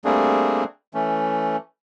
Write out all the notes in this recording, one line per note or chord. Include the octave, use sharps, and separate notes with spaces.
G3 A3 A#3 C4 D4 G#4
E3 A3 C#4